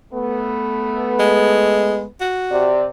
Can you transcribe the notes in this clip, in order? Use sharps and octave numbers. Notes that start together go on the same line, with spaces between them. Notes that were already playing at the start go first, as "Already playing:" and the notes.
A3 B3
G#3
F#4
C3 D5